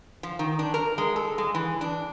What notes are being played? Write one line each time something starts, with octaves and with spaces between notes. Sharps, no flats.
F3
D#3
D4
A#4
G#3
A4
G#3
E3
D4